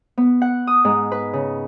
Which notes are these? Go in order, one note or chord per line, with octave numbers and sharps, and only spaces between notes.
B3
F#5
D#6
G#2
B4
C#3